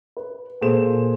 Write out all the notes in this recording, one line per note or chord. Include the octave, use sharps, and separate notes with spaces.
B4
A#2 G#4 A4 C5 E7